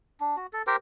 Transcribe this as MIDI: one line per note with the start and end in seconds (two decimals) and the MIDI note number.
0.20 0.36 62
0.36 0.47 66
0.53 0.62 69
0.67 0.76 67
0.67 0.76 70
0.67 0.76 72
0.67 0.76 79